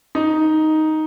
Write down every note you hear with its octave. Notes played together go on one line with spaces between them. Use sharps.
D#4